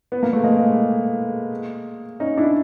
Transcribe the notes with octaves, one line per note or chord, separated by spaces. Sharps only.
B3
A#3
A3
G#3 A#3
C#4 D#4
D4 E4